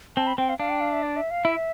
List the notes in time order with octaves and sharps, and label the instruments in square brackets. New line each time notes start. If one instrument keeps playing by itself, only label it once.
[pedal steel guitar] C4 [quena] A5
[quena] B5
[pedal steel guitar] C4 [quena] G5
[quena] F5
[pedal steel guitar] D4 [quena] F5
[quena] G5
F5
E5
D5
E5
F5
[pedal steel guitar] E4 [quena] E5